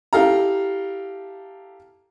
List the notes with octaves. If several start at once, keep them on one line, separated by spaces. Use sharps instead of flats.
E4 G4 A4 F5 A#5